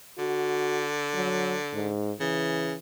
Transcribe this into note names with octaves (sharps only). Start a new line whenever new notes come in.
D3 F#4
F#3
G#2
C#3 E3